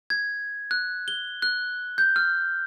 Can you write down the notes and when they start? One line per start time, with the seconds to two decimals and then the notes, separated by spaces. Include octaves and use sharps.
0.10 G#6
0.71 F#6
1.08 G7
1.42 F#6
1.98 G6
2.16 F6